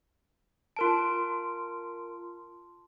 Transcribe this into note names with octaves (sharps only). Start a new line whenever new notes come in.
F4 A#4 A5 C6 D7